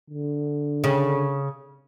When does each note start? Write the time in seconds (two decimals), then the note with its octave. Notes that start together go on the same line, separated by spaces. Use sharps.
0.10 D3
0.84 C#3